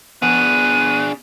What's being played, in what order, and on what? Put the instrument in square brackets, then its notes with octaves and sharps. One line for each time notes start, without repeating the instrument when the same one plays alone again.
[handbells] B3 [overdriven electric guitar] D4 G#4 [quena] F#6 [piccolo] D#7